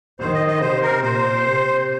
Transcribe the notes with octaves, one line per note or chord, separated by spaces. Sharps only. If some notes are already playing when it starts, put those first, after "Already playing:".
D#3 C5
D#5
D#5
C3 C5
A#4
A#2 C5
C3